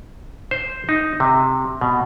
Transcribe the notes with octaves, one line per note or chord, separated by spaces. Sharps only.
C5
D#4
C3
B2